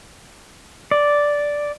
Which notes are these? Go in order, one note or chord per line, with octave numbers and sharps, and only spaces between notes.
D5